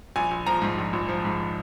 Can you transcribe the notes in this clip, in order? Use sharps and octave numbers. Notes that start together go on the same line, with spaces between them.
A#1 G#5
A#1
F3 A#5
G#2
A#1
A#1
F3
G#2